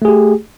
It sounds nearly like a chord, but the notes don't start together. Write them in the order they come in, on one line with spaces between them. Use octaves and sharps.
A3 G#4 G4